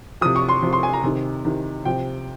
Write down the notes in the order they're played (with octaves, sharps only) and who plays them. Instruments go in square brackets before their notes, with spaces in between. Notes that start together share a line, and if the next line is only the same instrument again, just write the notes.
[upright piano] C3 F3 D#6
C#6
C6
C3 F3
C6
G#5
A#5
C3 D#3
C3 D#3
C3 F3 G5